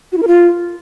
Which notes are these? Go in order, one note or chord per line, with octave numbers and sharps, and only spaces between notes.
F#4
E4
A#4
F4